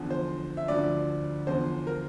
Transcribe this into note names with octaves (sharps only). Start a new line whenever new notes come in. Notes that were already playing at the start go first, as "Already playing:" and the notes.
Already playing: E2 D3 F3
C5
E5
D2 D3 F3 D5
E2 D3 F3 C5
A#4